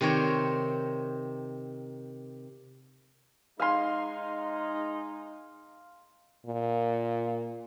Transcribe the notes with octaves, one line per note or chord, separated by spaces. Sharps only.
C3 D#3 C4 A#4 C#5
G#3 D#4 F5 G#5 C6
A#2